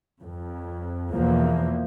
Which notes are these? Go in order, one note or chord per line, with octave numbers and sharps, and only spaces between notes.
F2
E2 B2 E3 F3 A#3